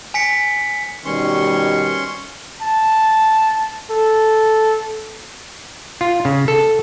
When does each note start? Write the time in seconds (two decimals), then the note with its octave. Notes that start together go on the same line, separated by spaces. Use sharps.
0.14 G#5 B6 C#7
1.05 B2 D#3 G3 C#4 C6 C#6
2.62 A5
3.91 A4
6.01 F4
6.25 C#3
6.48 A4